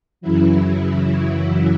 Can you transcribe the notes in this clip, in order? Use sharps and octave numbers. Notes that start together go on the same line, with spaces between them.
F#2 C#3 E3 F#3 E4